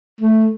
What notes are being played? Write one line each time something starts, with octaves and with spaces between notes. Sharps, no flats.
A3